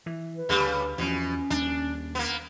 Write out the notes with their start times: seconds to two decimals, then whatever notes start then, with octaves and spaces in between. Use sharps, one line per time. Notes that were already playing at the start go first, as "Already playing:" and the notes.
0.06 E3
0.36 B4
0.49 D2 C#3 G3
0.98 E2 B2 F3 C#4
1.50 D#2 G3 D4
2.15 A#3 B3